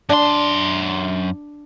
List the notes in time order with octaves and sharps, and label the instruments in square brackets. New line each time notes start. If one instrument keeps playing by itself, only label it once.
[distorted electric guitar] F#2 C6 [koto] D4